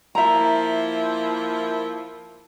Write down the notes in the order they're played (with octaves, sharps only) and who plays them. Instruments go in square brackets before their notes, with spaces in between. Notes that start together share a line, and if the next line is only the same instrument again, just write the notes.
[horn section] F3 A#3 E4 [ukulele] E5 A#5